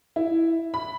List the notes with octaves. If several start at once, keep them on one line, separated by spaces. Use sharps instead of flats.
E4
B5